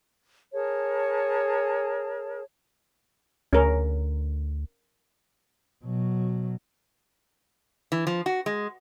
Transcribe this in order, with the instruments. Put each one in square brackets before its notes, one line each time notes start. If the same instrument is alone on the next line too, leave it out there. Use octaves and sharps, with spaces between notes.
[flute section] G#4 A#4 C#5 A5
[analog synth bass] D2 [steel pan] C#4 A#4
[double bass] B2 F#3
[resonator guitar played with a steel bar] E3
F3
F#4
G#3